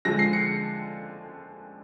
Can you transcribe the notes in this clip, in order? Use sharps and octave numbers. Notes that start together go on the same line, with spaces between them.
D3 F3 G#3 A#6
C7
C#7